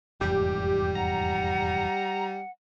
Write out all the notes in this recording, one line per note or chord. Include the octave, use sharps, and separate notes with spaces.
F1 E2 G#2 G3 G4
F#5 A#5